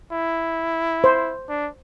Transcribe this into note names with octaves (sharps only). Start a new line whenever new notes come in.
E4
C5
D4